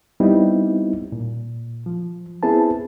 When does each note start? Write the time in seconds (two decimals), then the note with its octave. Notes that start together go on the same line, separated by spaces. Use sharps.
0.20 G3 B3 C4 D#4 E4
1.12 A#2
1.86 F3
2.43 B3 C4 E4 G#4 B4 A5